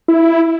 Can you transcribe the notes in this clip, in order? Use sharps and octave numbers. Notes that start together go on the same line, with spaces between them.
E4